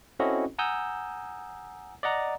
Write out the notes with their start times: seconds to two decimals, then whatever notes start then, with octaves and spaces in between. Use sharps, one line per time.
0.19 C4 C#4 E4 F#4 A4 D#5
0.59 F#5 G#5 A#5 D#6 E6 G6
2.03 D5 D#5 F#5 A#5